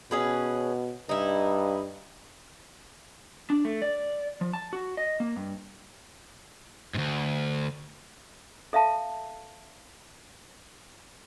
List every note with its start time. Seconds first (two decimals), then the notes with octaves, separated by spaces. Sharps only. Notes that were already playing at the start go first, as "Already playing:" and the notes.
0.11 B2 C#4 G#4 B4
1.09 G2 D#4 E4
3.50 D4
3.65 A3
3.82 D5
4.41 F3
4.53 A5
4.73 F#4
4.97 D#5
5.20 A#3
5.36 G2
6.94 D2 G#2
8.73 A4 E5 F5 A5